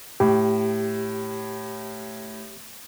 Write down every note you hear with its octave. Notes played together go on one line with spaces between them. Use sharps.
A2 G4